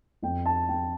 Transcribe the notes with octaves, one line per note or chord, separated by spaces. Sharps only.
F2 G5
A5
F2 G5